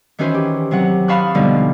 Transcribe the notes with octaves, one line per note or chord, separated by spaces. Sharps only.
D#3 E3 C#4 F#4 B4 C5
G4
C3 F#3 F#5
F5 A5 B5 C#6 D#6 F#6
B2 D3 F3 G3 D#4 F5